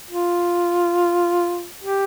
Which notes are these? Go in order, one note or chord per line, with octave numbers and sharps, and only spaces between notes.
F4
G4